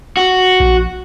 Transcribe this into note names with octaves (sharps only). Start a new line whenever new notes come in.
F#4
A#1